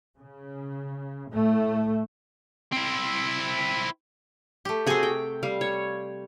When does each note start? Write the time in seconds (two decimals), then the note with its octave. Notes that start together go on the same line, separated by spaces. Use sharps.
0.18 C#3
1.30 A2 A3
2.72 C4 E4
4.65 A3 G4
4.86 C3 C4 F#4 G#4 G#5
5.03 G5
5.43 G3 F5
5.61 C#5